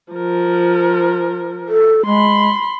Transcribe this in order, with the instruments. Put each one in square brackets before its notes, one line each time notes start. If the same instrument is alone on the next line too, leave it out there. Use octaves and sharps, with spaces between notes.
[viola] F3 A#4
[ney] A4
[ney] G#3 [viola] B5 C6